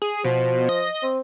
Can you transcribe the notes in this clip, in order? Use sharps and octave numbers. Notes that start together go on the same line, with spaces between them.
G#4
B2 F3
D#5
C4